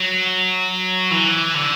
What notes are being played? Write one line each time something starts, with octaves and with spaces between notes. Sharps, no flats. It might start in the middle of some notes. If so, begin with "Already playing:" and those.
Already playing: F#3
E3
D3